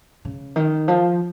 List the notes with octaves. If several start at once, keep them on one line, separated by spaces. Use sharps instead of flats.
C#3
D#3
F3